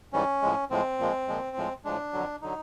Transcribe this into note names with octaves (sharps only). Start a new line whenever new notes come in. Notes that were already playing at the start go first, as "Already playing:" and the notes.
G#2 E3 G3 C#4
A2 F3 G#3
A2 F3 G#3 C4
A#2 F3 G#3
A#2 F3 G#3
A2 F3 G#3
A2 F3 G#3 D4
F2 D3 F#3
D3 F#3 D#4